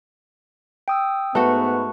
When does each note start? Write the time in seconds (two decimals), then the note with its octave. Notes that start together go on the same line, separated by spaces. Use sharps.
0.88 G5 D#6 E6
1.35 G#2 A3 B3 F#4 B4 C#6